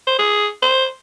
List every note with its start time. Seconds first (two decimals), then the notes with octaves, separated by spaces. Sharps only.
0.07 C5
0.19 G#4
0.62 C5